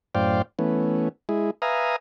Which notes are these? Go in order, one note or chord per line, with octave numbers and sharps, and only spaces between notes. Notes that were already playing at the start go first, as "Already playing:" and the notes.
F#2 A2 C5 D5 F5 G5
E3 A3 B3 C#4
G#3 E4 G#4
B4 E5 F5 G#5 A#5 D#6